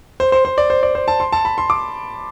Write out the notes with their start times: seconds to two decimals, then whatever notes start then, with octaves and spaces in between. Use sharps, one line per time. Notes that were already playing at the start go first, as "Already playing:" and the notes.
0.20 C5
0.32 C5
0.45 C5
0.58 D5
0.70 C5
0.83 D5
0.95 C5
1.08 A5
1.20 C6
1.32 A5
1.45 B5
1.58 C6
1.70 D6